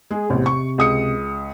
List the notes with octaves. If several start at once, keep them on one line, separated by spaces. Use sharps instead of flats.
G#3 G#4
A1 E2 C3
C#6
C#2 D#6 C#7